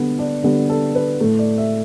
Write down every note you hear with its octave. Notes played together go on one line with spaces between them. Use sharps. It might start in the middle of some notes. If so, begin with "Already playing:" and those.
Already playing: D3 G3 B3
D4
D3 G3 B3
A4
B4
A2 A3
D5
E5